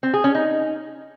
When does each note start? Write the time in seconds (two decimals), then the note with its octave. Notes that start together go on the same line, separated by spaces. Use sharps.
0.03 C4
0.14 G#4
0.24 C#4
0.35 D#4